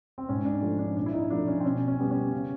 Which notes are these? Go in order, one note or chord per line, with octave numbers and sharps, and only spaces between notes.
C4
G#2 C#4
D4
F3 A3
D4
A#2 D4
E4
D#4
F3 A3 D4
C#4
C4
B2 C#4
C#4
G3 B3
C#4
C#3